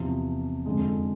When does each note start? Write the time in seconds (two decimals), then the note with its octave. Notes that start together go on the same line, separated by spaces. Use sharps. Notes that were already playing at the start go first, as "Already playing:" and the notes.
Already playing: E2 C3 F3
0.66 F2 D3 G#3